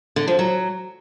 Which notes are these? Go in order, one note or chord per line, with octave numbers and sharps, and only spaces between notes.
D3
F3
F#3